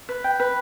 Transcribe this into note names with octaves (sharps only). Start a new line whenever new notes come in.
B4
G5
B4